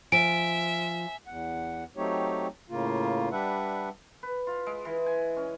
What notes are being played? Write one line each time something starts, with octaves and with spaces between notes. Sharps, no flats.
F3 E5 G#5 D7
E2 F#5
F#3 A3 C4 D#4 G4 C#5
A2 C#3 A#3 F4
G3 D4 B4 E5 F#5
B4
F4
G#3
E3
G#5
C#4